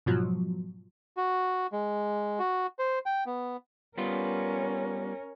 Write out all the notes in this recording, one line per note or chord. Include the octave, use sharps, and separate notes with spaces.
G#2 B2 F3 F#3
F#4
G#3
F#4
C5
G5
B3
G3 B3 C#4 F4 A#4